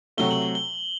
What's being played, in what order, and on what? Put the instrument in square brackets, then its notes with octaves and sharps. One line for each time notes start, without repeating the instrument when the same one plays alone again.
[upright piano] C3 F#3 A3 [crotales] G7
[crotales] F#7
G7
G7